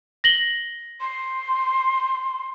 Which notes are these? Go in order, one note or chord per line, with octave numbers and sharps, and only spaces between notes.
A#6 F#7 G7
C6